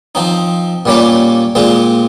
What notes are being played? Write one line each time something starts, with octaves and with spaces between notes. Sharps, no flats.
F3 C4 D#4
A#2 G3 A#3 C#4 F4
A#2 G#3 C4 F4